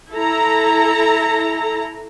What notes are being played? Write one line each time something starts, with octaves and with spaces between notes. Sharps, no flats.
E4 A4 A#5